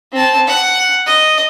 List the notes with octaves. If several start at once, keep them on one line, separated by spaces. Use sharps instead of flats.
C4 A5
F#5
D#5